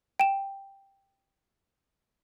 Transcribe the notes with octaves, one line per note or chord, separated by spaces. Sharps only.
G5 E7